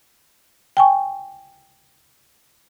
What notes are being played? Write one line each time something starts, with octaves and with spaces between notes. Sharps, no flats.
G5 G#5 C#6